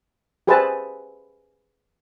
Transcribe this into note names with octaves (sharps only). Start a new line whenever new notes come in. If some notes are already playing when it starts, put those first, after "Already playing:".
G4 G#4 B4 C5 E5 A5